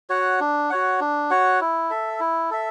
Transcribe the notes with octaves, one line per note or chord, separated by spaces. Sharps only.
F#4 C#5 F#5
D4
F#4 C#5 F#5
D4
F#4 C#5 F#5
E4
A4 E5
E4
A4 E5